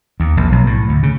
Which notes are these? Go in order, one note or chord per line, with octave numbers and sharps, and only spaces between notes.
D#2
A#1
B1
A2
D2
C#3